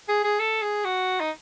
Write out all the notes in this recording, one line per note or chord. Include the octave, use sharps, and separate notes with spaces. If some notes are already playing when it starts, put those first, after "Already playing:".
G#4
G#4
A4
G#4
F#4
D#4